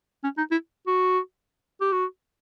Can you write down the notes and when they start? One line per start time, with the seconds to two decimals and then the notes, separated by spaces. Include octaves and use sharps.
0.23 C#4
0.38 D#4
0.51 E4
0.87 F#4
1.81 G4
1.92 F#4